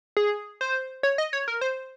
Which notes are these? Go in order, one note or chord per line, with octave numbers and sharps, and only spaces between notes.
G#4
C5
C#5
D#5
C#5
A#4
C5